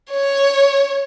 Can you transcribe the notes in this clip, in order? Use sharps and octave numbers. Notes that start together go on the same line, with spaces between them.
C#5